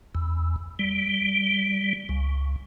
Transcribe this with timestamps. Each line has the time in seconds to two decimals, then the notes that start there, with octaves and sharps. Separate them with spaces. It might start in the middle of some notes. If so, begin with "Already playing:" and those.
0.15 E2
0.79 G3
2.09 C#2